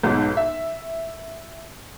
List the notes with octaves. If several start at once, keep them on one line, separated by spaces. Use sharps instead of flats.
B1 G#2
E5